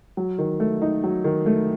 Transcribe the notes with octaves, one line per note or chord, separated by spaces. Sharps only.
F#3
D#3
A3
D#4
F#3
D#3
A3